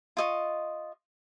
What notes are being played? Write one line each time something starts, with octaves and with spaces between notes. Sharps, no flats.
F4 D#5 C#6